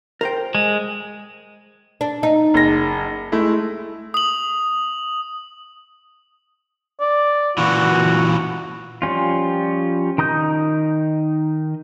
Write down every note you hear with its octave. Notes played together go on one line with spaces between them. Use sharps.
A#4 C5 G5
G#3
D4
D#4
F#1 A#6
G#3 A3 E4
D#6 F#7
D5
A#2 E3 F#4
F3 G3 C#4 F4
D#3 A#5 D#6 G6